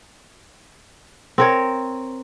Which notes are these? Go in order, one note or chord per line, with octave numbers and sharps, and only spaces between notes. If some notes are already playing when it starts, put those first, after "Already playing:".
C4 A#4 C#5